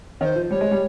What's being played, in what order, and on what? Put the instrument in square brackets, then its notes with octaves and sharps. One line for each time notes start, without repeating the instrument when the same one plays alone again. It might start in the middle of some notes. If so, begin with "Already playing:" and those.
[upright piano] D#3 [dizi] C5 C#5
[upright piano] F3
[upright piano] G3 [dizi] C#5
[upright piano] G#3
G3